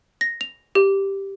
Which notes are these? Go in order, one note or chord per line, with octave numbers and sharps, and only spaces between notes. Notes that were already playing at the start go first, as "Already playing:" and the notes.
A#6
F7
G4